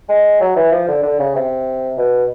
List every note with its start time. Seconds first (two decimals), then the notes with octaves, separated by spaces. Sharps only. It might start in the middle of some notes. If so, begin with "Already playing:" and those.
0.09 G#3
0.40 F#3
0.56 E3
0.71 F3
0.88 D3
1.03 D3
1.19 C#3
1.35 C3
1.97 B2